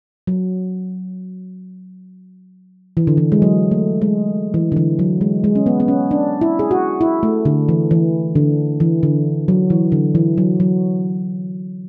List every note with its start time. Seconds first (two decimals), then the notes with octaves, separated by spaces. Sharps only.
0.27 F#3
2.97 E3
3.07 D3
3.17 E3
3.32 G#3
3.42 F#3
3.71 A3
4.02 G#3
4.54 E3
4.72 D3
4.77 E3
4.99 F#3
5.21 G#3
5.44 G#3
5.55 C#4
5.66 B3
5.80 B3
5.88 C#4
6.11 D4
6.41 E4
6.59 G#4
6.71 F#4
7.01 E4
7.23 A3
7.45 D3
7.69 E3
7.91 E3
8.36 D3
8.80 E3
9.03 D3
9.48 F#3
9.70 E3
9.92 D3
10.15 E3
10.38 F#3
10.60 F#3